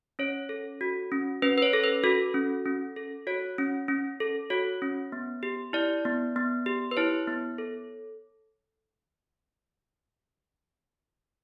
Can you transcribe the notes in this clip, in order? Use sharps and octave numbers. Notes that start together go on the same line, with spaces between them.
C#4 C#5
A4
F#4
C#4
C#4 B4
B4
C#5
A4
B4
F#4 A4
C#4
C#4
A4
F#4 C#5
C#4
C#4
A4
F#4 C#5
C#4
B3
G4
E4 D5
B3
B3
G4
B4
E4 C#5
B3
A4